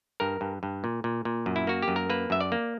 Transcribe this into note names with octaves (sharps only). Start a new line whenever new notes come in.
G2 A#4
G2
G2
A#2
A#2
A#2
F#2
E4
A#3 F#4
G4
F#2
A#4
A#3 B4
F#2 E5
D5
A#3